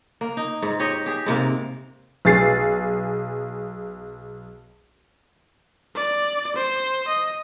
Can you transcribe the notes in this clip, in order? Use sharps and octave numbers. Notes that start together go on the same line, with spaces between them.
A#3
D#4
G#2
G4 C#5 D#5
G4 G#4
G#2 C3 A#3
B1 G#4 A6 C7
D5
C5
D#5